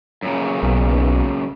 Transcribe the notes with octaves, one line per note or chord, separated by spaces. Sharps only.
F#2 A#2 C#3
B1